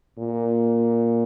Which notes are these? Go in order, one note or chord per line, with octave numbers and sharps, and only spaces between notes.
A#2